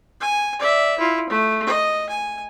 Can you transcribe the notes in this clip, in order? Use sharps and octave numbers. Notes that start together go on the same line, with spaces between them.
G#5
D5 E5
E4 F4
A3
D#5
G#5